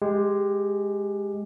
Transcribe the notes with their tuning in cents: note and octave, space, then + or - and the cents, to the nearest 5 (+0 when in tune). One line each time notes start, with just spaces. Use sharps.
G#3 +0 G4 +15